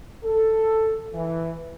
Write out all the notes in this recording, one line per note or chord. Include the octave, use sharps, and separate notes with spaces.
A4
E3